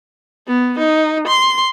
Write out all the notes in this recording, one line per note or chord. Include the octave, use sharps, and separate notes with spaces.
B3
D#4
C6